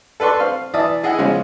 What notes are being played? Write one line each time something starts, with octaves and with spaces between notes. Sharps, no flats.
A4 B4 D5 C6 C#6
C4 F5 F6
E3 D5 E5 A5 D#6
E4 G#4 D#5 F#5
C#3 F3 G#3 C#4